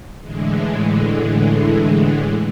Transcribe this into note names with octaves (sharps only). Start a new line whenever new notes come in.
A2 D3 E3 G#3